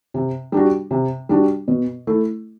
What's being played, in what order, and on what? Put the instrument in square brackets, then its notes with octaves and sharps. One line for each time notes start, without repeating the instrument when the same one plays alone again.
[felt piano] C3
G3 D4 F#4
C3
G3 D4 F#4
B2
A3 E4